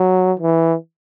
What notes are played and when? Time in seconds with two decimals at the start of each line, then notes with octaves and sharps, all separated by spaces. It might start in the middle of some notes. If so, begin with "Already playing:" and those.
Already playing: F#3
0.40 E3